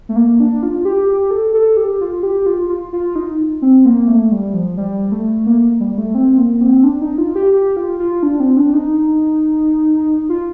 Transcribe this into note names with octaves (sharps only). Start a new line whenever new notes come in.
A3
A#3
D4
F4
G4
G4
A4
A4
G4
F4
G4
F4
F4
F4
D#4
C4
A#3
A3
G3
F3
G3
A3
A#3
G3
A3
C4
A#3
C4
D4
D#4
F4
G4
G4
F4
F4
D4
C4
D4
D#4
F4